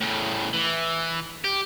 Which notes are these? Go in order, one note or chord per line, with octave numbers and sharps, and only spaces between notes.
A2 C#3
E3
G4